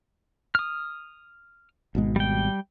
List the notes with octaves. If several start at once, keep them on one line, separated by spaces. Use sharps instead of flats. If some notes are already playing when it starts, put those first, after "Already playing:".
D#6 F6
G#1 B2 G#3
G3 G5